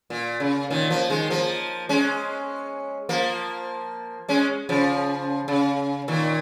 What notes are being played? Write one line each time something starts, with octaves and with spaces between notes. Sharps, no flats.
A#2
C#3
A#2 D#3
F3 A#3
D#3 G#3
F3 A#3
G#3 C#4
F3 A#3
G#3 C#4
C#3 F3
C#3
A#2 D#3